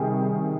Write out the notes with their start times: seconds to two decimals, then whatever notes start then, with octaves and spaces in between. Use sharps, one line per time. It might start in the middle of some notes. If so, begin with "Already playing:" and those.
Already playing: C3 D#3 G3 G#4